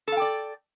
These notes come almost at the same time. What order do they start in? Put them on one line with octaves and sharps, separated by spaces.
A4 F5 G5 D5